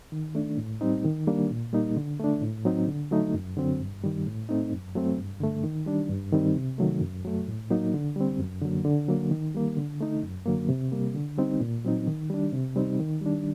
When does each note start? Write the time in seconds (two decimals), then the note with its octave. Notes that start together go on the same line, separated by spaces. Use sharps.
0.12 D#3
0.35 A3 D4
0.58 A2
0.81 G3 C4 D#4
1.05 D#3
1.27 G3 A#3 D4
1.51 A#2
1.73 G3 A#3 D#4
1.97 D3
2.19 A3 D4
2.42 A2
2.65 F#3 C4 D#4
2.88 D3
3.11 F#3 A3 D#4
3.34 F#2
3.57 D3 F#3 C4
3.80 G2
4.04 D#3 G3
4.26 A2
4.49 A3 C4 D#4
4.72 F#2
4.95 F#3 A3 C4
5.18 G2
5.40 D3 A3
5.64 D#3
5.86 G3 D4
6.10 G2
6.33 D#3 G3 C4 D#4
6.56 C3
6.78 D#3 F#3 A3
7.01 F#2
7.25 F#3 A3
7.48 A2
7.70 F#3 A#3 D#4
7.94 D3
8.16 G3 C4
8.39 F#2
8.62 D3 F#3 A#3
8.85 D3
9.08 F#3 A#3
9.31 D#3
9.54 G3 A#3
9.77 D3
10.01 A3 D#4
10.23 F#2
10.46 D3 F#3 A#3
10.69 C3
10.92 G3 A#3
11.15 D3
11.38 G3 C4 D#4
11.61 A#2
11.84 F#3 C4 D#4
12.07 D#3
12.30 G3 D4
12.53 C3
12.76 G3 C4 D#4
12.99 D#3
13.21 G3 D4